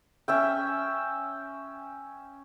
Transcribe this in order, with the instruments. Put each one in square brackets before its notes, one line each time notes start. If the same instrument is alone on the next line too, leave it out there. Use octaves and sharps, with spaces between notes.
[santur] C#4 E5 G5